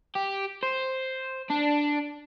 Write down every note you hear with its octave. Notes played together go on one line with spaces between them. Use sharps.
G4
C5
D4